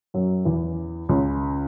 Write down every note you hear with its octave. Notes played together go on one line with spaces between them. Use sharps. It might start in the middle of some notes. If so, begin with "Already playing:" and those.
F#2 F#3
E2 E3
C#2 C#3